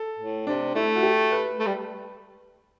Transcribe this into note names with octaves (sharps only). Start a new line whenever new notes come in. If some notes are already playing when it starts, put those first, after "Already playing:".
Already playing: A4
A2
C3 D4
A3 E4
F#4
G4
B4
A3
G3